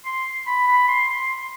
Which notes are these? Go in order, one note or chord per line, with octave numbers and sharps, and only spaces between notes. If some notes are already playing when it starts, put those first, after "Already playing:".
C6
B5
B5
C6
C6